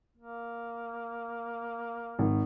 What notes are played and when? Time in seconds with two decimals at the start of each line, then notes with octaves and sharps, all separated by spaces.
0.18 A#3
2.19 G#1